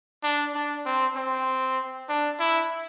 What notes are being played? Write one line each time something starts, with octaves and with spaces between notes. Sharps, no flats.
D4
D4
C4
C4
D4
E4